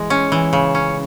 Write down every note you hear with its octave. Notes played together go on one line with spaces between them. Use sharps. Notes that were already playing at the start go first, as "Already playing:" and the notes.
Already playing: E3 G#3
C#4
E3
C#3
C#4